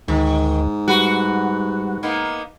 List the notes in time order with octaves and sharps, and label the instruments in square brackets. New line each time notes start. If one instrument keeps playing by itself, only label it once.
[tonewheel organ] D2 [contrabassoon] G#2 [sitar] D#3
[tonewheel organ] G3 F#5 [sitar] F#4 B4
[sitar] A#3 B3 D#4